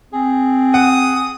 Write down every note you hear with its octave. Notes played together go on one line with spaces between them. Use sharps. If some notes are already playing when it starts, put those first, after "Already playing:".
C4 G#4
F#5 D#6